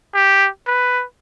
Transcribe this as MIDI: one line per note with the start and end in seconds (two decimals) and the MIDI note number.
0.14 0.48 67
0.67 1.04 71